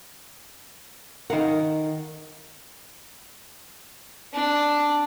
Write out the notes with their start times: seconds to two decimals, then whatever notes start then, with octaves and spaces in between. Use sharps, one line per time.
1.30 D#3 A#4 F5 F#5
4.33 D4